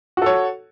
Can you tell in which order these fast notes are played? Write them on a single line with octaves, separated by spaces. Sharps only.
F#4 A4 C#5